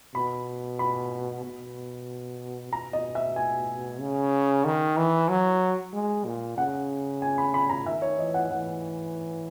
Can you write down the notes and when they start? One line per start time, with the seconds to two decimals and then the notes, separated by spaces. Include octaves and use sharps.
0.15 B2 B5
0.79 B5
1.44 B2
2.72 B2 A#5
2.93 D#5
3.15 E5
3.36 G#5
4.00 C#3
4.65 D#3
4.97 E3
5.29 F#3
5.93 G#3
6.25 A#2
6.57 C#3 F#5
7.22 G#5
7.38 B5
7.54 B5
7.70 A#5
7.86 D#3 E5
8.02 C#5
8.19 E3 D#5
8.34 F#5
8.51 E3 F#5